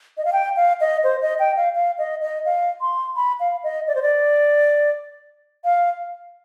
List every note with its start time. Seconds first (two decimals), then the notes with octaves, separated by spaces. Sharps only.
0.17 D#5
0.25 F5
0.33 G5
0.56 F5
0.80 D#5
1.04 C5
1.22 D#5
1.39 G5
1.57 F5
1.75 F5
1.98 D#5
2.22 D#5
2.45 F5
2.81 C6
3.16 B5
3.40 F5
3.63 D#5
3.88 D5
3.95 C5
4.02 D5
5.64 F5